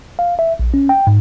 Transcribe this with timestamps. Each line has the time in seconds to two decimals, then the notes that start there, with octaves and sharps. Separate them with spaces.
0.19 F5
0.39 E5
0.59 A#1
0.74 C#4
0.89 G5
1.07 G#2